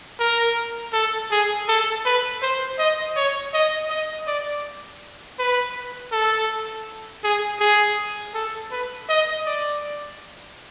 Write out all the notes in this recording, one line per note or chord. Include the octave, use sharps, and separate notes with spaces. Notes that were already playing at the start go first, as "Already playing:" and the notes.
A#4
A4
G#4
A4
B4
C5
D#5
C#5
D#5
D#5
D5
B4
A4
G#4
G#4
A4
B4
D#5
D5